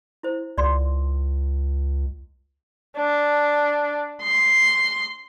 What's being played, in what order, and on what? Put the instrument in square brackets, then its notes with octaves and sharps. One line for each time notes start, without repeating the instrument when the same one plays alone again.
[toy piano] E4 C5
[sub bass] C#2 [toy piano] D5 C6
[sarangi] D4
C6